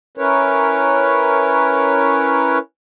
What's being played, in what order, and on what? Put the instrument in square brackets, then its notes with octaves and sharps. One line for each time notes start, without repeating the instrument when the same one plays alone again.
[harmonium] C#4 E4 A#4 B4 C#5